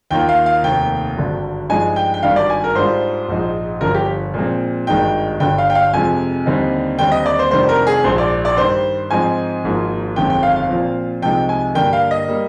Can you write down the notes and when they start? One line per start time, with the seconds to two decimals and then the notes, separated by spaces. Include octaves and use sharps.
0.11 D#2 D#3 A#3 F4 G5
0.29 F5
0.46 F5
0.63 F1 D#2 D#3 G5
1.16 G#1 G2 D3
1.70 G2 F3 G#3 D#4 G#5
1.96 G5
2.14 G5
2.23 G#1 G2 D#3 G3 D4 F5
2.36 D5
2.50 G#5
2.64 A#4
2.75 G#2 G3 D4 F4 C5
3.29 A#1 G#2 F3 G#3 D#4
3.81 G1 G2 F3 A#4
3.95 G4
4.34 A#2 F3 G#3 C4
4.87 G#1 G2 D#3 G#3 D#4 G5
5.40 G1 G2 D3 G3 G5
5.58 F5
5.70 G5
5.75 F5
5.93 F2 C3 F3 G#3 G#5
6.46 D#2 D3 G3 C4 D#4
6.99 D#2 D3 G3 C4 G5
7.12 D#5
7.26 D5
7.39 C5
7.51 F1 F2 D#3 G3 D4 C5
7.69 A#4
7.87 G#4
8.04 A#1 G#2 F3 C5
8.18 D5
8.45 D5
8.57 G2 D#3 G3 C5
9.10 G#2 F3 C4 D#4 G#5
9.64 G#1 G#2 F3 A#3
10.16 G1 F2 D#3 G#3 G5
10.30 G5
10.43 F5
10.56 F5
10.69 A#2 F3 C4
11.22 C2 C3 F3 G#3 D#4 G5
11.49 G#5
11.74 G2 D3 G3 A#3 G5
11.93 F5
12.11 D#5
12.28 G3 A#3